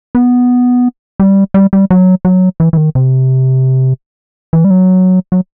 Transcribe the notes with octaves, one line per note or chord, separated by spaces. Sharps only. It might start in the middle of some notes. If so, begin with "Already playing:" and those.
B3
G3
G3
G3
F#3
F#3
E3
E3
D#3
C3
E3
G3
F#3
F#3